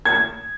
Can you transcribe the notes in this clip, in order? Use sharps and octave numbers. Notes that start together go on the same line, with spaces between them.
G#6